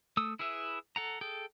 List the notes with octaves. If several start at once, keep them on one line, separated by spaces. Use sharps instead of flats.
A3 D#6 E6
E4 G#4 B4 E5
A4 F#5 A#5
G#4 A4 G5